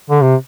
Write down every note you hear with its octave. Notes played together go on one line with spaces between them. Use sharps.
D3
C3